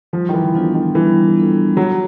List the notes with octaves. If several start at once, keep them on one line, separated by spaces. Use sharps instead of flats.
F3 G3
D#3
E3
F3 B3 D4 F4 A4
D#3
E3 G3
B3 D4 F4 A4
F#3 F4